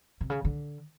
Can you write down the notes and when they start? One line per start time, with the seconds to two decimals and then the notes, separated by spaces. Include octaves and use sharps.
0.21 C3
0.30 C#3
0.45 D3